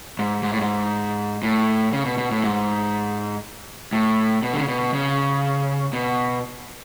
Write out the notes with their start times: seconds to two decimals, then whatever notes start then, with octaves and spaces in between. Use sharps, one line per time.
0.19 G#2
0.43 G#2
0.52 A2
0.59 G#2
1.43 A2
1.93 C#3
2.05 B2
2.18 B2
2.31 A2
2.44 G#2
3.93 A2
4.43 B2
4.53 D3
4.60 C#3
4.68 B2
4.94 C#3
5.93 B2